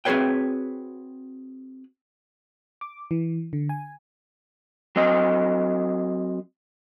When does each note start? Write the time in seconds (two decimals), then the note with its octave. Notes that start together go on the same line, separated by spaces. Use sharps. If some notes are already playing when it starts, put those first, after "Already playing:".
0.05 C4 F#4 G#4 B4 C#5 G5
2.81 D6
3.11 E3
3.53 D3
3.69 G#5
4.96 F#3 C4 D#5